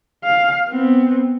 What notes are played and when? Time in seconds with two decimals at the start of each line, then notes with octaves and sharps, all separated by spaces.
0.24 F5
0.70 B3 C4